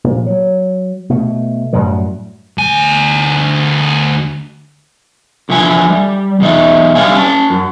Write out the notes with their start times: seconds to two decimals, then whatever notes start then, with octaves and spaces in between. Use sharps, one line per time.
0.04 A#2 F3
0.26 F#3
1.09 B2 A3
1.73 F#2 A2 F#3 G3
2.58 D2 G#5
5.49 E2 D3 F3 E5 G#5
5.90 G3
6.40 E2 B2 D#4 E5
6.95 D3 G3 A4 D5 F5 G#5
7.15 C#4 A5
7.50 F#2